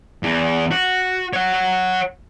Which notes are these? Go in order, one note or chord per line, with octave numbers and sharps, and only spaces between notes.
E2
F#4
C#5 F#5